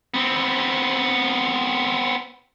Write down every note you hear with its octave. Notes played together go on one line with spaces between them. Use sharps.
B3 C4